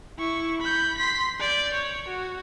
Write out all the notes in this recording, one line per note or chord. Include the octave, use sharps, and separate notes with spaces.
E4 C#6
B5 G6
C6 B6
D5 G6
C#5
F#4